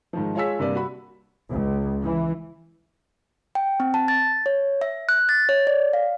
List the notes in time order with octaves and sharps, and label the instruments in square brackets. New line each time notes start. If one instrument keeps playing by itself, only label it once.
[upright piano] G#2 D#3 F3
G#3 F4 C#5 G#5 E6 B6
G2 C3 A#3 D5
F#4 B5
[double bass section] C#2
E3
[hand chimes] G5
C4
A5
A6
C#5
E5
F#6
A6
C#5
D5
F5